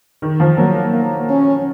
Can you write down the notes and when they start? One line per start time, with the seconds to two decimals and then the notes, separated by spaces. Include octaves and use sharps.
0.22 D#3
0.40 F3
0.58 F#3 A#3
0.94 A#3
1.29 C#4